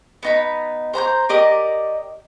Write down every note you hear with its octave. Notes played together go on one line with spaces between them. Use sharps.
B3 D#4 B5
C5 A#5 B5 G6
G4 A#4 D5 D#5